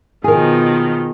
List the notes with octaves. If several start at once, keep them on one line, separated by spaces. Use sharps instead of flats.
B2 D#3 F3 G#4 A#4